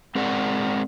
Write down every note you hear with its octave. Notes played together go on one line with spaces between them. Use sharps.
G#3 C4 G#4 A#4 D5 F#5